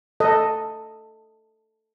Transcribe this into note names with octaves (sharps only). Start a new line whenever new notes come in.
A4 D#5